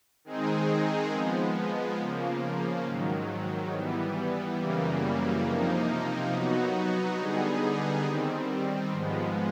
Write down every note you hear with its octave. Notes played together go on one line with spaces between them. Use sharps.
D#3 G#3 C4 D#4 G#4
F3 G#3 B3
C#3 F3 A#3
G#2 D#3 F#3
E3 G3 B3
F#2 C#3 E3 G3 A#3
C3 F3 A#3 D#4
F#3 B3 D#4 F#4
D3 G3 B3 D#4 G#4
D#3 G3 C4
G#2 F3 G#3 B3